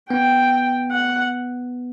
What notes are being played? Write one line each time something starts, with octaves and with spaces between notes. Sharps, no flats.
B3 G5
F#5